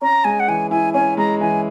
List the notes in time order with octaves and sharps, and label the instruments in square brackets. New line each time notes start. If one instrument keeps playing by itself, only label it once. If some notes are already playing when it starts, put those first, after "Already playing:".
[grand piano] C#4 [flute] A#5
[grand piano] G#3 [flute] G#5
[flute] F#5
[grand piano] E3 [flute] G#5
[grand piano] E4 [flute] G#5
[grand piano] C#4 [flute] G#5
[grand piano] G#3 [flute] A#5
[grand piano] E3 [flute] G#5